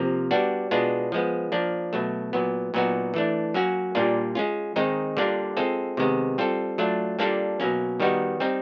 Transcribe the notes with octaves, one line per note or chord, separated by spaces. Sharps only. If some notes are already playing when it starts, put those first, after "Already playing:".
Already playing: C3 F3 A#3
G3 B3 D4 F#4
B2 G#3 B3 D4 F4
F3 G#3 B3
F3 A#3 D4
B2 F#3 A3
A#2 F#3 B3
A#2 F#3 B3 D#4 F#4
E3 A3 D4
F#3 A#3 C#4 F#4
A#2 G3 A#3 D4 F4
G#3 C#4 F4
D#3 G#3 C4 D#4
D3 G3 A#3 D4 F4
G#3 C4 F4 A4
C3 D#3 G#3 B3
G3 C4 F4 A4
F#3 A3 D4 F4
G3 A#3 D4 F4 A4
B2 F#3 A#3 C#4
D#3 G3 B3 D#4 F#4
G3 C4 D#4